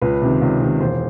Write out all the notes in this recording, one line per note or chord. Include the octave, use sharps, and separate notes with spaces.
C#2 B4
C3 D#3
C#2
C3 D#3
E1 C5